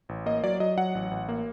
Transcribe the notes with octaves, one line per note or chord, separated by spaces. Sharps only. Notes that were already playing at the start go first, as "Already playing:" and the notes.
A1
A#3 D#5
F#3 D5
F#3 D#5
F#3 F#5
A1
A1
A#3